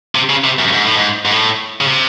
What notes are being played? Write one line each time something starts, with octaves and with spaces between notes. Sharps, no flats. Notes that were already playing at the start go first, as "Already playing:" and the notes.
C3
C#3
C3
F#2
G#2
A2
G#2
G#2
A2
C#3
C3